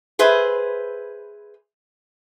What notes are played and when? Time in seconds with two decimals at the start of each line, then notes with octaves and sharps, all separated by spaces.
0.19 G#4 B4 C5 E5